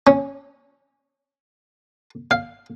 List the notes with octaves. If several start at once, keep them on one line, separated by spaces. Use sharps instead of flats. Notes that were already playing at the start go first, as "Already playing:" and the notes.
C#4
F5